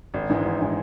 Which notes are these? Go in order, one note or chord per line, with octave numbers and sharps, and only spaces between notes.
G#1
G#2 E3 G#3
G#1
E3 G#3